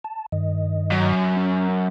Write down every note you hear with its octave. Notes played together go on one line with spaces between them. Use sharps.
A5
G2 D#3 D#5
F#2
C#4